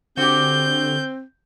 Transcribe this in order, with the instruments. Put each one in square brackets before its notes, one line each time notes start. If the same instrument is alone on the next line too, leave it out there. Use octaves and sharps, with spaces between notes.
[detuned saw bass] D3 [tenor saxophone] C4 [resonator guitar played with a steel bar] F#4 G4 [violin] G6